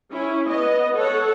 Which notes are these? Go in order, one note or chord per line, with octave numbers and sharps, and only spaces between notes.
C#4 E4
B3 D#5
A4 C#5 F#5